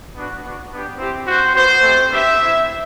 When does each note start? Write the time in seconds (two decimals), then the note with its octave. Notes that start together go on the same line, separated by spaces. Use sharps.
0.15 B3 D4 F#4
0.42 B3 D4 F#4
0.71 B3 D4 G4
0.98 C4 E4 G4
1.26 C4 F#4 C5
1.54 B3 F#4 C5
1.83 A3 C4 G4
2.11 B3 D4 G4 E5
2.39 A3 C4 E4